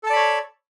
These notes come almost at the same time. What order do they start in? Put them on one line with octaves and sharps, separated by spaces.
A4 A5 D5 B5 C#5